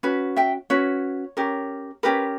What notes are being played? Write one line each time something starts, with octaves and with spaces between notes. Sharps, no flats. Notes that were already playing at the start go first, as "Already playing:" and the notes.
C#4 F#4 B4
E5 G5
C#4 F#4 B4 C#5
C#4 G4 A#4
C#4 G4 A#4 B4